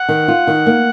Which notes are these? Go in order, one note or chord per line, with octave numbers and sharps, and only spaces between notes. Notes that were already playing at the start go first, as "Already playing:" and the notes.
Already playing: F#5
D#3
F4
D#3
A#3